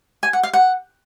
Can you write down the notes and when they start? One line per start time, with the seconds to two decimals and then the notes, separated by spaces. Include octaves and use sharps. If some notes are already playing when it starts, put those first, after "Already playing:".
0.23 G#5
0.33 F#5
0.43 F5
0.53 F#5